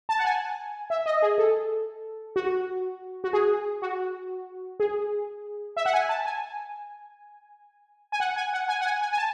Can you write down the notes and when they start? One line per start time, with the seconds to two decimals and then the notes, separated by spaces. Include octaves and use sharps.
0.09 A5
0.19 F#5
0.25 G#5
0.90 E5
1.06 D#5
1.22 G#4
1.38 A4
2.36 F#4
3.24 F#4
3.33 G#4
3.82 F#4
4.80 G#4
5.77 E5
5.86 F#5
5.93 G#5
6.09 A5
6.26 G#5
8.12 G#5
8.20 F#5
8.36 G#5
8.53 F#5
8.68 G#5
8.81 F#5
8.86 G#5
9.01 G#5
9.13 G#5
9.18 A5